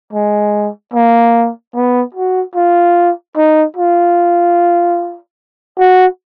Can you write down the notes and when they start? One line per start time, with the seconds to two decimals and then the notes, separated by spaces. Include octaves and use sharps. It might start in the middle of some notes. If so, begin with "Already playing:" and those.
0.13 G#3
0.94 A#3
1.75 B3
2.15 F#4
2.55 F4
3.37 D#4
3.77 F4
5.79 F#4